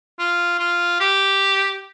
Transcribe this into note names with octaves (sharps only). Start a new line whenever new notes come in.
F4
F4
G4